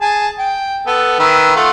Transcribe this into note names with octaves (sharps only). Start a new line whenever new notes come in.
G#4 A5
G5
B3 A4
D#3 B4 E5
A3 F4 F#5